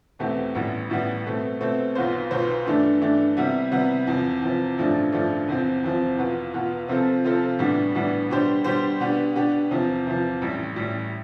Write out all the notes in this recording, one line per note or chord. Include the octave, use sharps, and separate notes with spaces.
E2 B2 A3 C4 G4
A1 A2 G3 B3
A1 A2 G3 B3
B2 A3 C4
B2 A3 C4
B1 B2 B3 F4 C5
B1 B2 B3 F4 C5
G2 E3 A3 D4
G2 E3 A3 D4
C3 G3 B3 E4
C3 G3 B3 E4
E2 C3 F3
E2 C3 F3
A1 G2 F3 A3 D4
A1 G2 F3 A3 D4
E2 C3 F3 C4
E2 C3 F3 C4
E2 B2 B3 F4
E2 B2 B3 F4
C3 F3 C4 F4 A4
C3 F3 C4 F4 A4
A2 E3 G3 B3 D4
A2 E3 G3 B3 D4
B2 G3 D4 G4 C5
B2 G3 D4 G4 C5
B2 B3 D4 G4
B2 B3 D4 G4
E2 C3 F3
E2 C3 F3
A1 A2 G3
A1 A2 G3